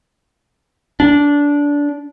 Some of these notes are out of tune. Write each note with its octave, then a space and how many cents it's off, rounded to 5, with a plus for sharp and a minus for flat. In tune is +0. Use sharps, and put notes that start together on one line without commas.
D4 -20